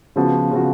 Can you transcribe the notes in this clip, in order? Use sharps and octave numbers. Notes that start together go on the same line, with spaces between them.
C#3 F3 B3 F#4
C#3 F3 B3 F#4